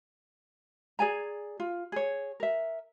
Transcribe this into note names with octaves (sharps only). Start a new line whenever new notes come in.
G#4 D5 G#5 A#5
F4
G#4 C#5
A#4 E5